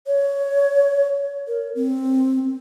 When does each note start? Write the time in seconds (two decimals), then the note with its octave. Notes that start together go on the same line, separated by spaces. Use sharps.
0.07 C#5
1.48 A#4
1.75 C4